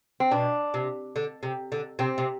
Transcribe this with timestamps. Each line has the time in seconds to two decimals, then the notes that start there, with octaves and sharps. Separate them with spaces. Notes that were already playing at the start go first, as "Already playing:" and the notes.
0.20 C4
0.31 B2 D4
0.74 C3
1.16 D3
1.43 C3
1.72 D3
1.99 C3 C4
2.18 C3